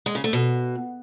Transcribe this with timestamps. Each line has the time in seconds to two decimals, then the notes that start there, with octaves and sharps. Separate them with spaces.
0.06 G#3
0.15 C#3
0.24 A3
0.33 B2